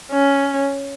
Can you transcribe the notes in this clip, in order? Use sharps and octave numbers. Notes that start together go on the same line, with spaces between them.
C#4